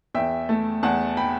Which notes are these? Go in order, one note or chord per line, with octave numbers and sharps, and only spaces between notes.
E2 E5 G5
A3
E2 F#5 A5
G5 B5